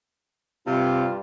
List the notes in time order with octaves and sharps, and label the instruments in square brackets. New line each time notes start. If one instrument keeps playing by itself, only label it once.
[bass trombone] G2 [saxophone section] C3 [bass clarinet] F4